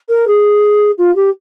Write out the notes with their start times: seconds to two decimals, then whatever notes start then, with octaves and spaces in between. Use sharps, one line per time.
0.09 A#4
0.27 G#4
0.98 F4
1.15 G4